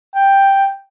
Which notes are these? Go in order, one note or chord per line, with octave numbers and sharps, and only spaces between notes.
G5